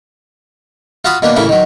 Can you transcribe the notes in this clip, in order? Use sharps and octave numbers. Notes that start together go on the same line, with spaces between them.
F4 F#4 F5 A5 B5 D#6
B2 A#3 D4 B4
A1 A2 C#3 E3 A#3 B5
D#3 F#3